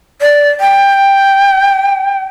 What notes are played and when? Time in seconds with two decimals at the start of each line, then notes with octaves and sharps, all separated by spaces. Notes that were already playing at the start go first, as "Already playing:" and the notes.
0.21 D5
0.60 G5